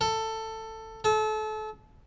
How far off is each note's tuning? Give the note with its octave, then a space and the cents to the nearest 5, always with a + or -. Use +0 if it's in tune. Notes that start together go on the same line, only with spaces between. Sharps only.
A4 +15
A4 -30